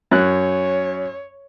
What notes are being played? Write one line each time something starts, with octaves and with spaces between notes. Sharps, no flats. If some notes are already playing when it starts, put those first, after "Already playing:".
F#2 C#5 F#6